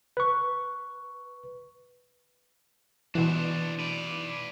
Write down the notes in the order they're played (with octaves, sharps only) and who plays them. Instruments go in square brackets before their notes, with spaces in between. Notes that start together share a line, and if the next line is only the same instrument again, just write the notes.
[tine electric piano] B4 C#6
[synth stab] B2 E3 [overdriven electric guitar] D4 C5
[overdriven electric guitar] B4 D5